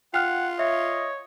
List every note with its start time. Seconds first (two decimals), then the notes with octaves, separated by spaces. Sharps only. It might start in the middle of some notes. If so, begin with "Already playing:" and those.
0.14 F4 F#5 G5 F6 F#6
0.59 C#5 D#5 E5